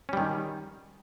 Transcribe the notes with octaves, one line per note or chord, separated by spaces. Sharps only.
D#3 G3 C#4